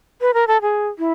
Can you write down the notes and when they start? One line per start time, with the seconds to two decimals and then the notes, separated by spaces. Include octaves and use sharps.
0.21 B4
0.34 A#4
0.47 A4
0.62 G#4
0.98 E4